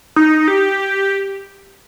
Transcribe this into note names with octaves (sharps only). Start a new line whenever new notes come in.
D#4
G4